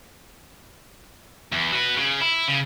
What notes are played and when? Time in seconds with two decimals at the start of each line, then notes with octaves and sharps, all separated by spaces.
1.52 E2
1.72 F#4 B4
1.97 C#3
2.20 E4
2.48 C#3